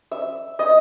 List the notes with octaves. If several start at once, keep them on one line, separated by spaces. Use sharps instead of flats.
E5
D#5